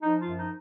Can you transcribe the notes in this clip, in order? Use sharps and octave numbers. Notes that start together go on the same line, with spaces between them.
F3 D#4
F4
F#2
D#4